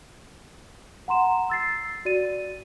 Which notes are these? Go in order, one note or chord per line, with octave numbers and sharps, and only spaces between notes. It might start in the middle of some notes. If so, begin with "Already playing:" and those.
F#5 A#5 C6 E7
E6 A6 C7
F#4 D5 A6 D#7